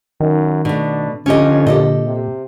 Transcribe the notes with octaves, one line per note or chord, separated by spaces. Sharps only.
F#2 D#3
B2 A3 D4
F2 D3 C#4 G4 D#5
A#2 G4 A4 D#5
C3